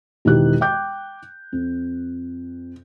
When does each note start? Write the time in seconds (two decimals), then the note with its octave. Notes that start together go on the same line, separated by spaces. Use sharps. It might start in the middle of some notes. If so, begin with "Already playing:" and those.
0.25 E1 D#3 E4 G4 F#6
0.61 G5 D6 G6
1.52 F2